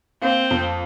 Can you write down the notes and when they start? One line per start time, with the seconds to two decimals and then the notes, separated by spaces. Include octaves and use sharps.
0.22 A#3 C4
0.50 F2